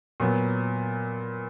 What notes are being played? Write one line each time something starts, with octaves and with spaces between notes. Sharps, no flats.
A#2 F#3 B3